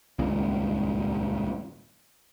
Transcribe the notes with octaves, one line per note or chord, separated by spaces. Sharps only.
D#1 C#2 G2 A#2